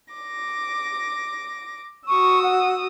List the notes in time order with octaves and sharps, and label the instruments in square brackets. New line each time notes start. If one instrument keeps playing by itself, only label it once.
[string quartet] D6 A#6
[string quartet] F#4 D#6 E6 [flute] C#6
[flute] F#5